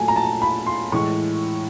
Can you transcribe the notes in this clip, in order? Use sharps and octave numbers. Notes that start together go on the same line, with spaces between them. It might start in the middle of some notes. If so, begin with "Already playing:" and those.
Already playing: A#2 F#3 A3 G#5 A5
A#5
A5
B5
C6
A2 E3 G#3 C#6